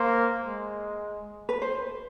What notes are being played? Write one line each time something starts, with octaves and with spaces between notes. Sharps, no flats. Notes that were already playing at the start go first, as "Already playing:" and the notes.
Already playing: A#3 C5
G#3
B4
C5